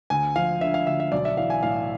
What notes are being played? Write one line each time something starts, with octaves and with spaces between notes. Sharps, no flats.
D2 G#5
F3 F5
D3 E5
F5
D2 E5
E5
B1 D5
E5
E3 F5
G#5
A2 F5